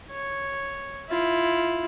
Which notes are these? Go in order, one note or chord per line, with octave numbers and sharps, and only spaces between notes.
C#5
E4 F4